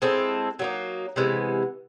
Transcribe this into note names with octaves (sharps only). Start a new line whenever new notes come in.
G#3 C4 E4 A4
F#3 A#3 D#4
C3 E3 G#3 B3